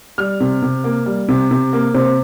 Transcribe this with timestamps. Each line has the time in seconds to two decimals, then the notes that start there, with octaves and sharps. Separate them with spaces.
0.18 G3 F6
0.40 C3
0.62 C3
0.84 A#3
1.06 G3
1.28 C3
1.51 C3
1.73 A#3
1.94 C3 C5